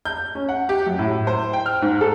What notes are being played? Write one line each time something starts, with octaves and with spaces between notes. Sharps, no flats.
G6
C#4
F#5
G4
F#2
A2
C5
G5
F6
G#2
A4